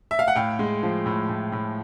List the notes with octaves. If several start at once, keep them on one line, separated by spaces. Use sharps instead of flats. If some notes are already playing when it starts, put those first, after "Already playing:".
E5
F5
F#5
A2 F5 G5
G#3
F3
A2
A2
A2